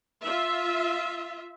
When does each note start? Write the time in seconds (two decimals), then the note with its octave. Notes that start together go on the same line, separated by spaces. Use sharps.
0.25 F4 E5